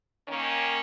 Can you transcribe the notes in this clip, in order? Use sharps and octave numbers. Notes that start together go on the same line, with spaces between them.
D#3 A#3 C#4